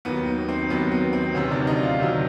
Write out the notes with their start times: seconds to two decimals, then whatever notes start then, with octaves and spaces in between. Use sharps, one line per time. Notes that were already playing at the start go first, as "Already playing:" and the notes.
0.05 D#2 D#3 F#3 B3
0.49 C4
0.70 D#2 D#3 F#3 B3
0.92 B3
1.13 C4
1.34 D2 C3 D#3 F#3 C#4
1.51 D4
1.67 D#4
1.83 F4
2.00 D2 C3 D#3 F#3